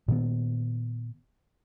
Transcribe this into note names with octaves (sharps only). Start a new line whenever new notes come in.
A#2 D#3 B3